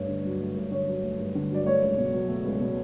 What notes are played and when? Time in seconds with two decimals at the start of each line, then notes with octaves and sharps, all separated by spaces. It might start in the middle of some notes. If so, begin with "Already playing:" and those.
Already playing: G2 A3 C#5
0.08 D3
0.25 F#3
0.40 A3
0.56 G2
0.71 D3 C#5
0.87 F#3
1.03 A3
1.19 G2
1.35 D3
1.50 F#3 D5
1.66 A3 C#5
1.82 C#2
1.98 B2
2.13 F#3
2.28 A3
2.44 C#2
2.60 B2